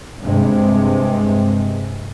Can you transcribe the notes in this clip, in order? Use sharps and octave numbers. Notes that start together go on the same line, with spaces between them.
G2 C3 G#3